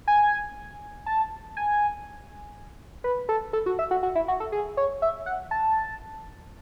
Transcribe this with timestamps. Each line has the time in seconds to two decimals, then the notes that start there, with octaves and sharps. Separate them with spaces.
0.07 G#5
1.06 A5
1.57 G#5
3.04 B4
3.29 A4
3.53 A4
3.66 F#4
3.79 E5
3.91 F#4
4.03 F#4
4.15 E4
4.28 F#4
4.40 A4
4.52 G#4
4.77 C#5
5.02 E5
5.26 F#5
5.51 A5